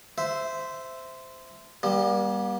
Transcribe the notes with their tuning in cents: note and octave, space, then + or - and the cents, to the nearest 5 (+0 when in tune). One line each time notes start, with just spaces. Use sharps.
C5 -15 E5 +0
G3 +0 A#3 +45